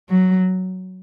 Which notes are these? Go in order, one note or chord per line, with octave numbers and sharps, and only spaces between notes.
F#3